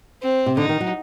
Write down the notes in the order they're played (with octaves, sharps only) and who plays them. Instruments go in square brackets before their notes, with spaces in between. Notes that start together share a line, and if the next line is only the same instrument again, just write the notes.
[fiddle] C4
[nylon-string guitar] C3
[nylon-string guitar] D3 [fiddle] D#4
[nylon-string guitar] D#3
F#3